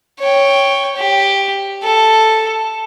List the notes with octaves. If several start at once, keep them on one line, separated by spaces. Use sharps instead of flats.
C#5 G5
G4
A4